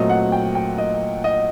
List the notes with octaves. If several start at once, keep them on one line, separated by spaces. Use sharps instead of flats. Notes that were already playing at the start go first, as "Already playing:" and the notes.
Already playing: A#2 F#3 A3 C4 D#5
F#5
G5
G5
D#5
D#5